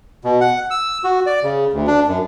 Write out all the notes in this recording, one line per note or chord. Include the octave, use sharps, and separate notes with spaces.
B2
F#5
E6
F#4
D5
C#3
D2
D4
F#2